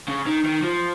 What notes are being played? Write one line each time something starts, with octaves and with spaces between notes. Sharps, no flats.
C#3
D#3
D#3
F3